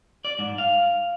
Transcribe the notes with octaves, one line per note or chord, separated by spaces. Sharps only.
D5
G#2
F5